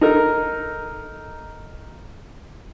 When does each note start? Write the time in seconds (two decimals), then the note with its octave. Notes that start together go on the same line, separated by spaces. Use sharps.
0.01 D#4 A4 A#4